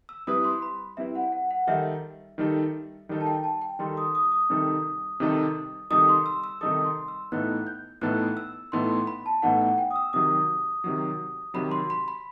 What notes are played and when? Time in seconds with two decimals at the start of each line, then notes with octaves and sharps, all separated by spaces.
0.09 E6
0.27 G3 C4 E4 B4 D#6
0.45 C6
0.62 B5
0.97 G3 C4 E4 B4 E5
1.15 F#5
1.32 F#5
1.51 F#5
1.67 D#3 G3 D#4 A4 E5
2.38 D#3 G3 D#4 A4
3.09 D#3 G3 D#4 A4
3.21 A5
3.27 G5
3.44 A5
3.62 G5
3.79 D#3 G3 D#4 A4 C6
3.97 D#6
4.15 D#6
4.32 D#6
4.50 C3 D#3 G3 D#4 A4
5.20 C3 D#3 G3 D#4 A4
5.90 C3 D#3 G3 D#4 A4 D#6
6.09 C6
6.26 E6
6.44 E6
6.61 C3 D#3 G3 D#4 A4 D#6
6.85 C6
7.08 E6
7.32 A2 E3 B3 D#4 A4 F#6
7.67 G6
8.01 A2 E3 B3 D#4 A4 F#6
8.37 E6
8.72 A2 E3 B3 D#4 A4 C6
9.07 B5
9.26 A5
9.42 A2 E3 B3 D#4 A4 F#5
9.61 F#5
9.78 G5
9.91 D#6
9.96 E6
10.13 C3 D#3 F#3 D#6
10.84 C3 D#3 F#3
11.54 C3 D#3 F#3 B5
11.71 C6
11.90 B5
12.08 B5